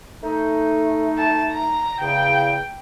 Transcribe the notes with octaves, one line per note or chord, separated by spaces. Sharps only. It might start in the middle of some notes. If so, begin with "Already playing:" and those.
A3 D#4
A5
A#5
E2 C#3 G5